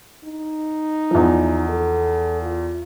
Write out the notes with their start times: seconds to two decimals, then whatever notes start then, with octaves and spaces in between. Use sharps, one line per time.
0.24 D#4
1.11 E2 F3
1.69 A4
2.42 F4